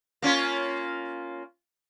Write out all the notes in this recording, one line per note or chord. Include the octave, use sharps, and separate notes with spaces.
A#3 C#4 F4